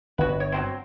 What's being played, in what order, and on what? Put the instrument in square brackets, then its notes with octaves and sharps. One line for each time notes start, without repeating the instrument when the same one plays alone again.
[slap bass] G1 [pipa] F#4 B4
[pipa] C#5
F#3 G3 C4